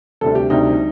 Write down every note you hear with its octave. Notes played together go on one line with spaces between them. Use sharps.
D2 C3 G3 A4
G4
D2 C3 G3 D#4